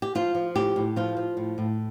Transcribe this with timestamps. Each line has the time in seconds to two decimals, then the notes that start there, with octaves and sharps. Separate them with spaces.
0.02 G4
0.15 F3 F4
0.35 F3
0.55 A2 G4
0.76 A2
0.96 F3 F4
1.17 F3
1.37 A2
1.58 A2